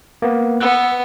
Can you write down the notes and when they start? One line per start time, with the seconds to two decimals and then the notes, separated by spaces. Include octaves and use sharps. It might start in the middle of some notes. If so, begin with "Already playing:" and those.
0.22 A#3 B3
0.60 B3 B4 E6 F#6